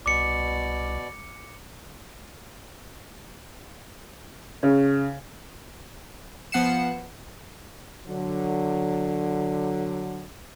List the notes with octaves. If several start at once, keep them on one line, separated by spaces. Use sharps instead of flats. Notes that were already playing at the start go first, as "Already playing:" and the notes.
C2 B2 D5 D6 C#7
C#3
F3 B3 F#5 C7 C#7 E7
D3 F#3